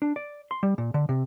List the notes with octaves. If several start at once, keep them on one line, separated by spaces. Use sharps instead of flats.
D4
D5
C6
G3
A#2
D3
C3